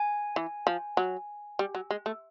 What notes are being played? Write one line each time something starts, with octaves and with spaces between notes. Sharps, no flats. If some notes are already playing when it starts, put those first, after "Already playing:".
Already playing: G#5
E3
F3
F#3
G3
F#3
G#3
A3